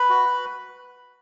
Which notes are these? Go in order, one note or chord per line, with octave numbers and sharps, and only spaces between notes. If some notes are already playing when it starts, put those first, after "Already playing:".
Already playing: B4 B5
F#4